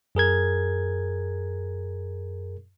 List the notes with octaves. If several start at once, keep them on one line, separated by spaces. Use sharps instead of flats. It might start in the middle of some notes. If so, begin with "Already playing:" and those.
F#2 G#4 A#4 G#6